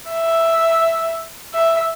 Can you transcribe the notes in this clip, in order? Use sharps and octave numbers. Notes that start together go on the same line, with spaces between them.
E5
E5